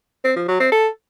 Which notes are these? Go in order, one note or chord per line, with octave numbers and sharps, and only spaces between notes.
C4
F3
F#3
C4
A4